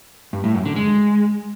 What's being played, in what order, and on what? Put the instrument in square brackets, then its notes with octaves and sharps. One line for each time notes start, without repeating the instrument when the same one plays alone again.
[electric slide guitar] G2
A2
F#2
D3
G#3